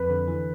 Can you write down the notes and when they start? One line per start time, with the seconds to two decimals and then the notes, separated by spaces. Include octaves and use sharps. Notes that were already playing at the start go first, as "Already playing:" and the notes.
Already playing: F2 B4
0.10 D3
0.28 E3